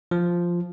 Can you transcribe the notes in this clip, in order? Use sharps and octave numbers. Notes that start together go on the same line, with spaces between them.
F3